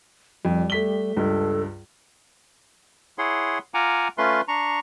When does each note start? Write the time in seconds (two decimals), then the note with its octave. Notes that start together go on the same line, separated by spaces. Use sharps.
0.45 F2 G3
0.70 A3 B6 G7
1.16 C#2 G2 A4
3.18 E4 G#4 C#5 F#5 C6
3.74 F4 F#5 G#5 A#5 D6
4.18 A3 C#4 F4 B4 C6
4.48 D4 A#5 C#6